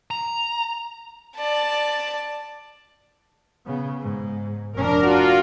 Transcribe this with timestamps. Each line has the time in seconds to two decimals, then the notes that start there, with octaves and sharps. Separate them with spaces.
0.11 A#5
1.36 D5 A5
3.66 C#3 B3
4.01 G#2
4.73 F1 D4 A#4
5.03 F4 F#4